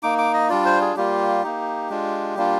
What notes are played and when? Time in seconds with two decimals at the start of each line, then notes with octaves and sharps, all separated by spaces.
0.03 A#3 D#4 D6
0.18 D6
0.34 D#5
0.50 G3 D4 F4 D5
0.65 C5
0.81 G#4
0.96 G3 A#3 F4 G4
1.43 A#3 D#4
1.90 G#3 D4 F4
2.37 G3 A#3 D4 F4